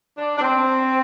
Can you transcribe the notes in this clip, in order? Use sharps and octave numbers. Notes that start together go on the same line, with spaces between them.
D4
D4
C4